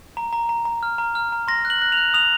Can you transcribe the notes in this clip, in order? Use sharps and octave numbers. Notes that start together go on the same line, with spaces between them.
A#5
A#5
A#5
A#5
F6
A#5
F6
A#5
C6 A#6
F#6
F#7
F#6
F#6 F7
D#6 F7